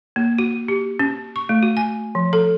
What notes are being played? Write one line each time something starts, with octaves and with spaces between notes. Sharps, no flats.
A#3
F#4
G4
C#4
C#6
A3
F#4
G#5
F3
A4